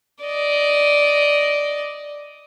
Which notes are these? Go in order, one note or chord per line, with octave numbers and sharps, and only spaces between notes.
D5 D#5